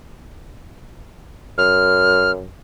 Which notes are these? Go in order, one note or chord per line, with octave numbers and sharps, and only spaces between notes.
F#2 F6